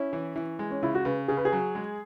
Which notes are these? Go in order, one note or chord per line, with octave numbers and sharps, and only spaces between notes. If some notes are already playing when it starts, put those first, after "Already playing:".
Already playing: C#4 E4
E3
E3
G#3
C#4
C#3 E4
F#4
C#3 B4
C#3 G#4
B4
G#4
F#3
G#3